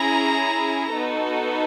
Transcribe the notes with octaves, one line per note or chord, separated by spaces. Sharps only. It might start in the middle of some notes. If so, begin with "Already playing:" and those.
Already playing: C#4 E4 G#4 A#5
B3 D#4 F#4 A4